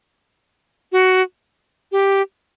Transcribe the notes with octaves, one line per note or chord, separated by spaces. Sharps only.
F#4
G4